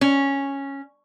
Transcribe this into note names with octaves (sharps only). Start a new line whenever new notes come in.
C#4